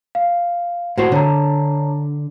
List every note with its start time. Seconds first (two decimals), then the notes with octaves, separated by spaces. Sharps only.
0.15 F5
0.98 A2 F#4 C5
1.12 D3 C#5 A5 A#5